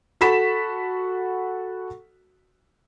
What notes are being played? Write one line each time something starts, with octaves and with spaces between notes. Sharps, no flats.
F#4 A4 F#5 B5 B6 E7